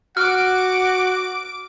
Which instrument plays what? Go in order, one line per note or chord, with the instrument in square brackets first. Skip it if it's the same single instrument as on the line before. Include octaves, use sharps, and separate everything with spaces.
[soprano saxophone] F#4 [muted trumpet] F#5 [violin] D6 D7 [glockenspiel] F6